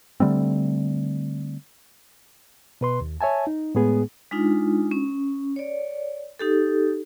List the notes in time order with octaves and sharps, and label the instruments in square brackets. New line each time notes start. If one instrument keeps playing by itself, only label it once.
[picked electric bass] D3 G3 A3 C4
[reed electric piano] B2 B4 C6
D#2
C#5 E5 G#5 A5
D#4
A2 G#3 B3 G#4
[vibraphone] G#3 D4 D#4 F4
C#4
C#5 D5
D#4 G4 A4